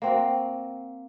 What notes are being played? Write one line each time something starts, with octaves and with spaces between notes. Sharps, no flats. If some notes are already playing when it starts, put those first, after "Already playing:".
A#3 C4 F#4